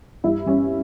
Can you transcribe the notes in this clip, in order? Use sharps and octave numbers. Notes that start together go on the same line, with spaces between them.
G2 E4
G2 C#4